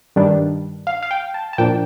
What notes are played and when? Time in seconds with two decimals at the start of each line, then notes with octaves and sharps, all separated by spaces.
0.16 G2 D#3 G3 D4
0.87 F5
1.03 F5
1.11 G5
1.34 A5
1.53 A5
1.58 A#2 F3 A#3 D4 G5